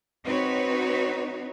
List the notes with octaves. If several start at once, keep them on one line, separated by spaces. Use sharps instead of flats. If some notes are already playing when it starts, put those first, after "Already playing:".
C4 D#4 F#4 B4 C#5